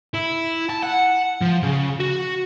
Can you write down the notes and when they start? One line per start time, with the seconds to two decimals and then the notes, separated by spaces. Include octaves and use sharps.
0.14 E4
0.70 A5
0.83 F#5
1.42 F3
1.63 C#3
2.00 F#4